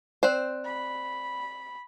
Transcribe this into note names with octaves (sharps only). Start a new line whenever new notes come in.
C4 C5 D5 F#6
B5